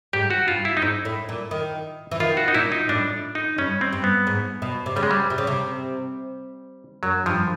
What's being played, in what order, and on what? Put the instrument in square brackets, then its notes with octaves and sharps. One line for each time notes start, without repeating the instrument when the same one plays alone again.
[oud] G#2 [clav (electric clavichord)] G4
[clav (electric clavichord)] F#4
[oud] G2 [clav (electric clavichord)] F4
[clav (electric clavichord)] E4
D#4
[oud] G#2 [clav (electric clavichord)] E4
[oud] A2
A#2
D#3
E3
[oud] D#3 [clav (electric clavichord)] F4
[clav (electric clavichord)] F#4
D#4
[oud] A#2 [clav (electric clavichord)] E4
[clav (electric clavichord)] D#4
[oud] A2 [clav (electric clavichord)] D4
[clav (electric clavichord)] D#4
[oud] G2 [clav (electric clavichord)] C#4
[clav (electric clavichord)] C4
[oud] G2
[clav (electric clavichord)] B3
[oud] G#2
B2
C3
[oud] C#3 [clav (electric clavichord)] G3
[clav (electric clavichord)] G#3
G3
[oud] C3
C#3
C3
[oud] F#2 [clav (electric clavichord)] F#3
[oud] G2 [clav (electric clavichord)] F3